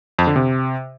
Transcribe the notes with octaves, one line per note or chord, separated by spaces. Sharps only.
F2
D3
C3